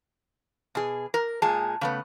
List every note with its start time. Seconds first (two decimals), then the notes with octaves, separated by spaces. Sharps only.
0.75 B2 G#4
1.14 A#4
1.42 A#2 G#3 G#4 A5
1.81 C#3 A3 B3